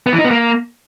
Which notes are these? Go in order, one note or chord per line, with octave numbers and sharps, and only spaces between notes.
B3
E3
D#4
B3
A#3